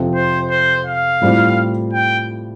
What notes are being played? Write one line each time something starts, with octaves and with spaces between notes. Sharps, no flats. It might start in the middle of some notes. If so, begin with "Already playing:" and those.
Already playing: F2 C3 F3 C4
C5
C5
F5
A2 G3 C4 F4 C5
G5